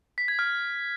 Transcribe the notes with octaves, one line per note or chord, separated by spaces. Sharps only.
B6
G#6
F6